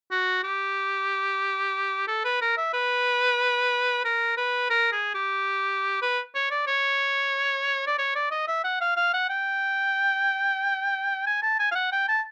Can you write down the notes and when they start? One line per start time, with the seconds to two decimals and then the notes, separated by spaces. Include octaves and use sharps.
0.11 F#4
0.44 G4
2.08 A4
2.25 B4
2.41 A#4
2.57 E5
2.73 B4
4.05 A#4
4.37 B4
4.70 A#4
4.92 G#4
5.14 G4
6.02 B4
6.35 C#5
6.51 D5
6.67 C#5
7.87 D5
7.99 C#5
8.15 D5
8.31 D#5
8.48 E5
8.64 F#5
8.81 F5
8.97 F5
9.13 F#5
9.30 G5
11.27 G#5
11.42 A5
11.59 G#5
11.72 F5
11.75 F#5
11.92 G5
12.09 A5